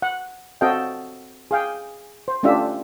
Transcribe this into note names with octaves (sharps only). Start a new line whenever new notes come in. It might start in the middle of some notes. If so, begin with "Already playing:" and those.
F#5
C4 F#4 A4 D#5 F5 G5
G#4 F5 G5
C5
A3 C#4 D4 F4 G4 E5